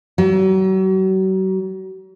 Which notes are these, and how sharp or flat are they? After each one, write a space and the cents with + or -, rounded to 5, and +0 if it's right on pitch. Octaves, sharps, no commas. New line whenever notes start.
F#3 +40